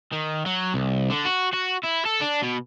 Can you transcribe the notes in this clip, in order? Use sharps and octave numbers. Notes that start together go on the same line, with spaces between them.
D#3
F#3
C2
D3
F#4
F#4
E4
A4
D4
B2